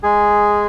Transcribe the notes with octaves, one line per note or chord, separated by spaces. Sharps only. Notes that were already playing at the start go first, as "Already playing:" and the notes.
G#3 G#4